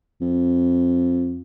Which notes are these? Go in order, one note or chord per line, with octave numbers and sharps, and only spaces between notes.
F2